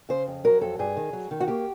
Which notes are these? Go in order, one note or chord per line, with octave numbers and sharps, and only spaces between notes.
C#3 C5
F2
F#3 A#4
F2 A4
G2 G#4
D#3
F#3
D#3
F#4
A#3 G4